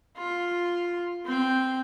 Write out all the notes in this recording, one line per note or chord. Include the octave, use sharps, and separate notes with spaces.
F4
C4 G5